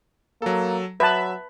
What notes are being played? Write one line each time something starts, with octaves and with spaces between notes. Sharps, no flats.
F#3 A#3 A4
F#3 B4 E5 A5